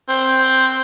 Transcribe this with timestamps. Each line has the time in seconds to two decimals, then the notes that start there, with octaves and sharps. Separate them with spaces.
0.08 C4